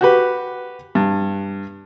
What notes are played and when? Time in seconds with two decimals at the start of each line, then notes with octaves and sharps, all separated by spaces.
0.01 F#4 G4 B4
0.95 G2